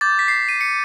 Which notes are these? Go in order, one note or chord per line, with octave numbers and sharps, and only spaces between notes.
D6 G6 A6
B6
C7
D#7
C#7